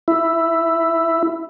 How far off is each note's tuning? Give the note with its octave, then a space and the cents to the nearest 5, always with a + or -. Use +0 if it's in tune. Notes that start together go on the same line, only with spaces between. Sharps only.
E4 +5